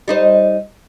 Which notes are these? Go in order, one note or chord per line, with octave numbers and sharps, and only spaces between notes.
G3 D#4 C5